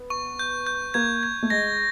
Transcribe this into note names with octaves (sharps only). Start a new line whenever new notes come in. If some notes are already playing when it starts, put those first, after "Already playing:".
Already playing: B3
C#6
G6
G6
A#3 G#6
G#6
A3
G#3 A#6